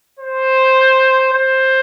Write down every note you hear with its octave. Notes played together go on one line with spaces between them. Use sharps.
C5
C5